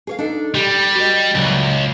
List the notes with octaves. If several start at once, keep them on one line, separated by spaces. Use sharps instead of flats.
G#4 C#5 F5
D4 D#4 A4
G3 G4
F#4 D#5
C#2 A#2 D3 F#3